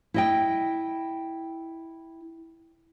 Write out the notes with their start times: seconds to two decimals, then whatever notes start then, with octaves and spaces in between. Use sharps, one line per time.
0.14 E4 D#5 G5